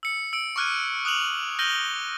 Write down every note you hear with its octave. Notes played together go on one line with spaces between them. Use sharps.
E6 C#7
E6 D7
C#6 D6 F6 F#6 G#6 D#7
D#6 F#6 F7 F#7
F6 G6 A#6 D#7 F#7 G7